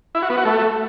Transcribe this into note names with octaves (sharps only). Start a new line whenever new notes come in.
E4
F#4
B3
F#4
A3